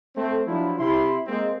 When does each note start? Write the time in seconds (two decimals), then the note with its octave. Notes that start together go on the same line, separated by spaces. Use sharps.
0.16 A3 C4
0.46 F3 F#3 D4 E4
0.78 C3 E4 C6
1.27 G#3 A#3 C4